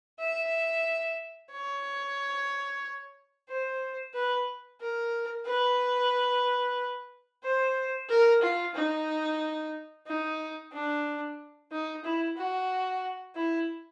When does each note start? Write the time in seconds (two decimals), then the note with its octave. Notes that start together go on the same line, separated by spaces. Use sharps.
0.20 E5
1.51 C#5
3.48 C5
4.14 B4
4.80 A#4
5.45 B4
7.43 C5
8.09 A#4
8.41 F4
8.75 D#4
10.07 D#4
10.72 D4
11.71 D#4
12.04 E4
12.37 F#4
13.35 E4